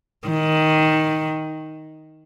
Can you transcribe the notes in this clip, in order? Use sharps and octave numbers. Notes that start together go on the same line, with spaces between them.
D#3